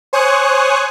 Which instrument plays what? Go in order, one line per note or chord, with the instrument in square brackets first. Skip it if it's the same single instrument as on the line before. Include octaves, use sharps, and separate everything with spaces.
[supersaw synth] C5 C#5 G#5 C#6 D#6 F#6